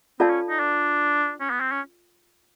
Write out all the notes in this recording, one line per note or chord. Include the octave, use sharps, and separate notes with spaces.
C4 F4 A4 D5 F5 A5
C#4
D#4
D4
C#4
B3
C4
C#4